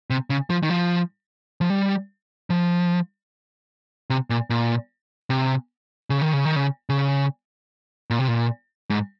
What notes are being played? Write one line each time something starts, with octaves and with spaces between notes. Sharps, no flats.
C3
C#3
F3
D#3
F3
F3
G3
F3
C3
A#2
A#2
C3
C#3
D#3
C#3
D#3
C#3
C#3
A#2
C3
A#2
G#2